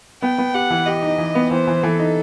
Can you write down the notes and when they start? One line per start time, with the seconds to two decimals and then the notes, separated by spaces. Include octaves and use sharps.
0.22 B3 G5
0.38 B3
0.54 G4 F#5
0.70 E3
0.86 G4 D#5
1.03 D#4
1.18 E3
1.35 B3
1.51 E3 C5
1.68 E3
1.83 E3 A4
1.99 D#4